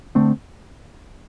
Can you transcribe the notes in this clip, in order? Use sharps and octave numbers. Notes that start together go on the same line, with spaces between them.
D3 A3 C4